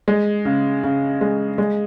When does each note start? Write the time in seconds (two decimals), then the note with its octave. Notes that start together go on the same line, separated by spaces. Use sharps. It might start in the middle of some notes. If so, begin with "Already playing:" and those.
0.08 G#3
0.45 C#3
0.83 C#3
1.21 G#3
1.58 G#3